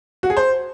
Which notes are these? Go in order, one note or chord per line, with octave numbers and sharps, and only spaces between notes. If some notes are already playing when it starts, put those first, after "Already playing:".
F#4
G#4
C5